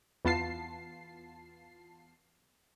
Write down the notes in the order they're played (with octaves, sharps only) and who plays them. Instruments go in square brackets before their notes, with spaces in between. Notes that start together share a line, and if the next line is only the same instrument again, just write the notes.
[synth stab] E2 B3 F4 A5 C7